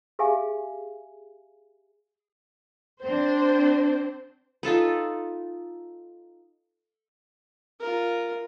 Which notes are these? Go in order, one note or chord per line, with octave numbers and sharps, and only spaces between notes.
G4 G#4 E5 F5 G#5
C4 D4 C5
D#4 F4 A4 B4
F4 A#4